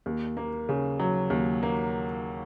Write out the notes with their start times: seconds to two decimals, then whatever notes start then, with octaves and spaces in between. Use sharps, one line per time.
0.06 D#2
0.37 A#3
0.69 C#3
0.99 F#3
1.30 D#2
1.63 A#3